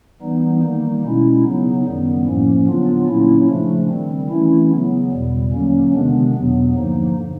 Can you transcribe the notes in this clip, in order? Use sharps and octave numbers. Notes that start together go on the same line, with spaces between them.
E3 G3 B3 D#4
D#3 G3 A#3 D#4
B2 G#3 C#4 E4
C#3 F#3 B3 D#4
F#2 D#3 G3 B3
A2 F3 A#3 C#4
D3 F#3 B3 D4 F4
A#2 F#3 A#3 C#4 E4
C#3 F3 A3 D4
D#3 G3 C4
E3 A3 C#4 E4
C#3 F#3 B3
E2 B2 G3
D3 F#3 A#3 C#4
C3 D#3 G#3 B3 D4
E2 B2 F#3 B3
G2 D3 F3 A#3 D#4